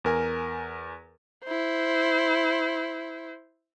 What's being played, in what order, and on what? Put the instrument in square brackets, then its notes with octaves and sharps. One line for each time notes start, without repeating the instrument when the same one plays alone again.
[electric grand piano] E2 A#4 G#5
[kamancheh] E4 C5